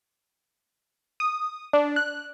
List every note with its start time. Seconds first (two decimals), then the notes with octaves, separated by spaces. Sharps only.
1.20 D#6
1.73 D4
1.96 F#6